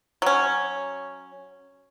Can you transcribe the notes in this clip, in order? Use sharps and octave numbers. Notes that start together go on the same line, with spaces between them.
F#3 C#4